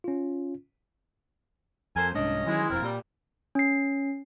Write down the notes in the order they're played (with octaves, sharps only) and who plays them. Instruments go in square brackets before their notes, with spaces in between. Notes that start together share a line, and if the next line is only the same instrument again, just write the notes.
[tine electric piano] C#4 F4
[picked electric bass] F2 [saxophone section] A4 A#4 C5 [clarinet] G#5
[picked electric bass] C2 G#2 [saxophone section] C#4 D#5 [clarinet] D4
[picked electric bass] D#3 E3 F#3 [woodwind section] G#3 [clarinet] E4
[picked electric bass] E1 F2 [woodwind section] C4 F4 A#4
[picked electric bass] A#2 [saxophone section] G3
[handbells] C#4 C7